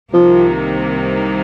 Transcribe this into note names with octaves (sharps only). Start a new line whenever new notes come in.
C2 C3 D#3 F3 A#3